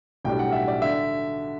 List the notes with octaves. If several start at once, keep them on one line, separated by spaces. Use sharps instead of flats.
B1 A2 G3 D4 G5
F#5
E5
D5
D3 E5